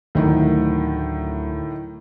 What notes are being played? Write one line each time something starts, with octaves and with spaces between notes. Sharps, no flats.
D2 A2 D#3 F#3